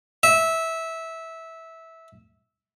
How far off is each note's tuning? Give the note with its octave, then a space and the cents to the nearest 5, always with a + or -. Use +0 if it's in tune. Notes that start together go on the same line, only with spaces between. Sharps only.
E5 -15